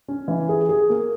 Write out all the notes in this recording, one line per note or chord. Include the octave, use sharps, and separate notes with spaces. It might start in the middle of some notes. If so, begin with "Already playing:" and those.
C#4
E3
G#4
G#4
A#3